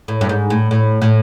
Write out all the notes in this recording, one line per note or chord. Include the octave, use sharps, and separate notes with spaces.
A2
G2
G#2
A2
A2
A2